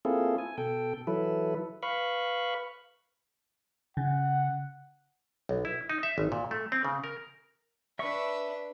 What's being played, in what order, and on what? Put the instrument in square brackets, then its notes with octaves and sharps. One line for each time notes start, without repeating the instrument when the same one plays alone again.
[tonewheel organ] A#3 C4 E4 F4 G#4 A4
G#5
B2 A4 G5
E3 F#3 E4 A4 B4
B4 F5 B5 C#6
[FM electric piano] C#3 [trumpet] F#5
[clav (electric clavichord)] B1
E4
D#4
E5
G#1
A#2
A3
C4
C#3
A#4
[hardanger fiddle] D4 B4 [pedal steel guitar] E5 C#6